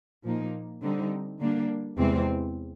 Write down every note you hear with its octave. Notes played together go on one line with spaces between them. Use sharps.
A#2 F3 A#3 D#4
D3 G3 C4 D#4
D3 G3 A#3 D4
E2 C3 E3 G#3 C4